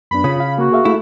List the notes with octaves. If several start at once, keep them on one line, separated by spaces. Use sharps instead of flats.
F#2 B3 D4 B5
C#3 F4 D#6
F5
A#3 F#4
G#4 E5 F5
A3 E4